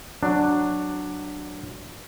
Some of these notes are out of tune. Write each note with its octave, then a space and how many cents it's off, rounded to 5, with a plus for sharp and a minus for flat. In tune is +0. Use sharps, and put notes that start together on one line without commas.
F#3 +0 D4 +10